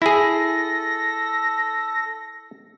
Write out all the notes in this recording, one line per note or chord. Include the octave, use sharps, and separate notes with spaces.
E4 G#4 A4 A#6